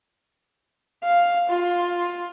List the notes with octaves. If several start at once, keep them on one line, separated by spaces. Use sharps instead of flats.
F5
F4